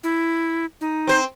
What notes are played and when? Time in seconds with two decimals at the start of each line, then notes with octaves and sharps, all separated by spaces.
0.03 E4
0.81 D#4
1.07 C4 C5